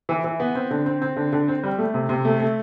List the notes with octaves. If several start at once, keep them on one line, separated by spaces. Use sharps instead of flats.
E3
E3
B3
C4
D3
C4
C4
D3
D3
C4
G3
A3
C3
C3
A3
A3